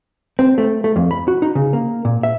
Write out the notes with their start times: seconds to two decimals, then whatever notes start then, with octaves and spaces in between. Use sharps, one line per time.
0.39 C4
0.58 A3
0.84 A3
0.96 F2
1.11 B5
1.28 F#4
1.42 D#4
1.55 C#3
1.73 A#3
2.05 A#2
2.23 E5